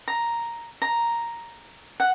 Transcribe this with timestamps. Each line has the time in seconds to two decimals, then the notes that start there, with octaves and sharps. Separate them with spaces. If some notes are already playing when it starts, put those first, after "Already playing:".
0.08 A#5
0.82 A#5
2.00 F#5